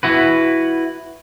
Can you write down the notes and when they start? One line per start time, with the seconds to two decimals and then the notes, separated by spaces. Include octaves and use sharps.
0.03 E4 F#4 B4